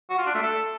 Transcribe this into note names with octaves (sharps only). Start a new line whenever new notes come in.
F#4
F4
D4
A3
A4